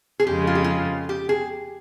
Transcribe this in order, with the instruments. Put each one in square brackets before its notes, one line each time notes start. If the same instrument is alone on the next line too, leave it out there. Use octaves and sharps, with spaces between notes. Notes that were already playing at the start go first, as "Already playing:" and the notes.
[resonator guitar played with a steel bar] G#4
[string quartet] F2 C#3 G#3 [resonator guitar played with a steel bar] G4
[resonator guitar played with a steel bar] F4
G4
F4
G4
G#4